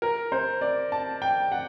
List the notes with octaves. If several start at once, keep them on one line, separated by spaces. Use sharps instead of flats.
A#4
C5
D5
A5
G5
F#5